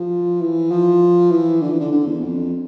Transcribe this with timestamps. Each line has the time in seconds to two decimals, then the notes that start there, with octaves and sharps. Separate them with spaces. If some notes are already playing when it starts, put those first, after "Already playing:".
Already playing: F3
0.41 E3
0.71 F3
1.31 E3
1.61 D3
1.71 E3
1.80 D3
1.92 D3
2.06 E2
2.21 F2